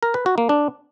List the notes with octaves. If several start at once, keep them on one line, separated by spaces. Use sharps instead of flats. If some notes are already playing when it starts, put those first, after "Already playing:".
A#4
B4
F#4
A#3
D4